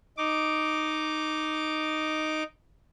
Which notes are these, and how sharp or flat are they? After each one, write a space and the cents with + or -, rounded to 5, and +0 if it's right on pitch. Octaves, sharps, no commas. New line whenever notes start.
D#4 -5 D6 -5